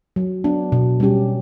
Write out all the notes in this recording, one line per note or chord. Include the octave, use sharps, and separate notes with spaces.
F#3
B3 D4
B2
G3 C#4 G4